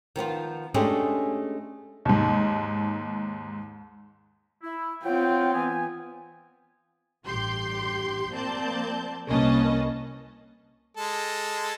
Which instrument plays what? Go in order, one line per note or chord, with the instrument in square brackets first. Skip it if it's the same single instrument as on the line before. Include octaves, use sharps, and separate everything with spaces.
[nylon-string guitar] D#3 F3 B3 F4
G#3 A3 C#4 D4 G4 G#4
[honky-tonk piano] D#2 G#2
[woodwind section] E4
[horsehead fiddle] C4 F4 [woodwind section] C#5 F#5 G5
[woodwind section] E3 B3 G#5
[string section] A1 G2 G4 C6 G6
F3 A#3 C4 D5 A5 G6
C2 A#3 C#4 B4 D#5 A5
[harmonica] G#3 A4